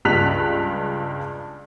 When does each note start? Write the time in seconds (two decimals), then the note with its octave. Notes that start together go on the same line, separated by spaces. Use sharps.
0.05 C#2 G2 F#6 B6 F7